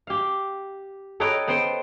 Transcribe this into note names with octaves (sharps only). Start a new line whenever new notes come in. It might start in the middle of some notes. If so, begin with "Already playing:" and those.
G4 F5
A4 B4 C#5 D#5 G5 A#5
B3 C5 G5 C6